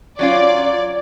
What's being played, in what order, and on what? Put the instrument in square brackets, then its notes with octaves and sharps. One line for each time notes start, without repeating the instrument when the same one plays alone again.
[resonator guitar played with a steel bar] F#3 C#4 F4 [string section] D5